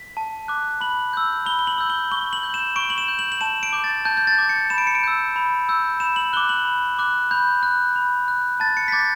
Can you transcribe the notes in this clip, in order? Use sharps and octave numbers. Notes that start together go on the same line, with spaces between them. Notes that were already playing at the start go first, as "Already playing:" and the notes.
Already playing: B6
A5
D6 F#6
B5 F#7
E6 G6
B5 G7
G7
F#7
E6 G6
G7
C#6 G7
F#7
G6
E7
C#6 D7
F#7
E7
G6
F#7
F#7
A5 E7
D7
D6 G6
A6
A5 G6
G6
A6
D6 G6
C#7
B5 E7
D7
C#7
D7
E6 G6
B5
E6 G6
B5 E7
F#7
D6 F#6 G7
F#7
B5
D6 F#6
B5 G6
F#6
B5
F#6
A5 A6
C#7
B6
D6 G6 A6